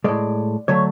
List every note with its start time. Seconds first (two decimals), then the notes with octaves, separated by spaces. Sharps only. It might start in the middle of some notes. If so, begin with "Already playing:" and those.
0.04 A2 G#3 D5
0.68 D3 F#3 A3 C#5